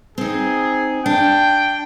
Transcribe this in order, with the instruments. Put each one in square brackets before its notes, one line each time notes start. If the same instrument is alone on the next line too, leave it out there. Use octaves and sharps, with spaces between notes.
[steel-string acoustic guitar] C4 D#4 [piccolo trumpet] G#4
[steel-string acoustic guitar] D4 [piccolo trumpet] G5